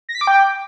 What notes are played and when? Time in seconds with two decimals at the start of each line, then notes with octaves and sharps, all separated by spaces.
0.09 A#6
0.15 B6
0.21 D6
0.27 G5